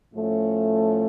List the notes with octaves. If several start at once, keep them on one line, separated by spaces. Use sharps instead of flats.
A2 F3 A3 C#4